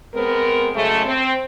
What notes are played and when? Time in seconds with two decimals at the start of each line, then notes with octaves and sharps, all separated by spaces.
0.14 G#3 B3 C4 A#4
0.75 F#2 C#3 G#3 A3
1.06 C4